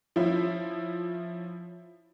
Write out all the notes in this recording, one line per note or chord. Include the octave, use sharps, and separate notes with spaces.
F3 C#4 E4